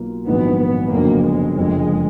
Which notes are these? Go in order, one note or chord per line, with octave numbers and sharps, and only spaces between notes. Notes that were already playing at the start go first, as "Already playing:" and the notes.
Already playing: B1 B2 A#3 F4
A#1 G#2 D#3 F#3 B3
B3
F#1 F2 D3 F#3 A#3 B3
G#3
F#1 F2 D3 F3 G#3